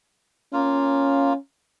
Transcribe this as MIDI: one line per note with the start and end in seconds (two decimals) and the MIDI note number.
0.53 1.33 58
0.53 1.36 61
0.53 1.33 65